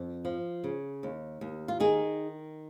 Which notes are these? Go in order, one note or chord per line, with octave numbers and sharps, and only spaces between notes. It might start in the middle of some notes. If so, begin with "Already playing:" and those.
Already playing: F2
F3
C#3
D#2
D#2
F4
D#3 D#4 G#4